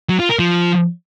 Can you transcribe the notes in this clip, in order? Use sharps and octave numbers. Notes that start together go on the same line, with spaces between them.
F#3
F4
A#4
F3